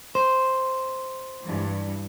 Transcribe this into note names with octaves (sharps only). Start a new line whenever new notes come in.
C5
G2 E3